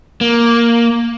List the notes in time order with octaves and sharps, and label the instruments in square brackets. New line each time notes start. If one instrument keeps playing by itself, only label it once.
[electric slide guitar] A#3